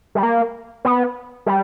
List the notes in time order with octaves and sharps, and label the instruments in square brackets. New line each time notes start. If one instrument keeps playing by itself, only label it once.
[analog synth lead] G3
A#3
B3
G3